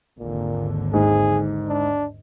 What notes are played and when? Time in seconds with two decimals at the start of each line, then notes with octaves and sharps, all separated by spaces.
0.20 G#1 D#2 A#2 D3
0.94 G#2 G#4
1.69 D4